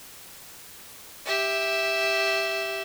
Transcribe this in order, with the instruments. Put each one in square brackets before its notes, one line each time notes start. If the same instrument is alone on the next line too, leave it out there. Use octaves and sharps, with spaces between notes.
[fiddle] G4 E5